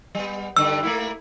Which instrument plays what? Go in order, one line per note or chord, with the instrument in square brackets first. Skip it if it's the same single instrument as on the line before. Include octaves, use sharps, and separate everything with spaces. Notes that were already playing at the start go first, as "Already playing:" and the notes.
[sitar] G3 B3
[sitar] G2 D3 [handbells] E6
[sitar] A3 A#3 E4